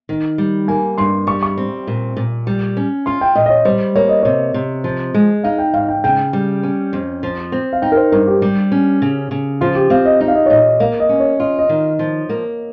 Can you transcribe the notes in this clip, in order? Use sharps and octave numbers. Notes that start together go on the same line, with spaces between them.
D#3
G3
A#3 G#5
G2 C6
G3 C#6
C#6
C4
A#2
A#2
G3
C#4
F4 C6
G5
A#2 D#5
D#5
C#5
G3 C5
A#3 C#5
D#5
C3 C#5
C3
F3
G#3
D#4 F5
G5
G#2 F5
G5
C#3 G5
G3
C#4
F2
F3
C4
F5
D#4 G5
A#4
C5
G2 A#4
G4
G3
C#4
C#3
C#3
F3 F4
G4
C4 F5
D#5
D#4 D#5
F5
D#5
C#5
A#2 D#5
A#3 F5
D#5
C#4
C#5
F4 D#5
D#5
D#3
F3
A#3